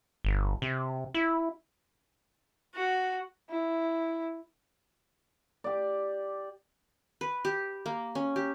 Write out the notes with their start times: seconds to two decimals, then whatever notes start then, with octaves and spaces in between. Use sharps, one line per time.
0.25 G1
0.62 C3
1.14 E4
2.75 F#4
3.50 E4
5.64 G4 D5
7.21 B4
7.45 G4
7.86 A#3
8.15 C#4
8.36 G4